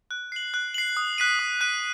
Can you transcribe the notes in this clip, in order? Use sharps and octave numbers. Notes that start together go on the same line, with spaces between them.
F#6
C7 F#7
F#6
C7 F#7
D#6
F#6 B6 D#7
D#6
F#6 B6 D#7